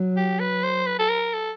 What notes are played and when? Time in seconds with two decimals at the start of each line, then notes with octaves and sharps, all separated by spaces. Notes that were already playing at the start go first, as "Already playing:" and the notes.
Already playing: F#3
0.17 G4
0.40 B4
0.63 C5
0.87 B4
0.99 A4
1.09 A#4
1.34 A4